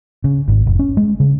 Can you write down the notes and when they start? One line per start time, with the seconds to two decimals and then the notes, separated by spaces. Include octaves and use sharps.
0.24 C#3
0.48 G#1
0.66 F1
0.79 C#4
0.97 G#3
1.20 C#3